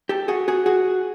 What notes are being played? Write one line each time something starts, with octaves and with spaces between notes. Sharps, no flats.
G4 A4
F#4 G#4
F#4 G#4
F#4 G#4